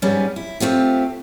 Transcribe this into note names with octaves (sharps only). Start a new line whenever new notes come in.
G#2 G3 G#3 B3 C#4
E4
A3 C4 F4 G4